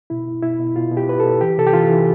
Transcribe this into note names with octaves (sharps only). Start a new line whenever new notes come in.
B2 E4
B2
B2 E4
B2
B2 F4
B2
G4
B2 B4
A4
B2
E3 G4
C3 A4
G4
E3 F4
E3